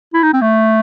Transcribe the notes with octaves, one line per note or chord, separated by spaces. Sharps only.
E4
D#4
C4
A3